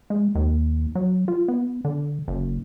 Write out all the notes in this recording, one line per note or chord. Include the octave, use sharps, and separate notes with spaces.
G#3
D#2
F#3
F4
B3
D3
F#1